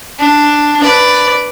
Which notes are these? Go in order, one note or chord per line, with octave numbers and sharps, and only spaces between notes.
D4
B4 D5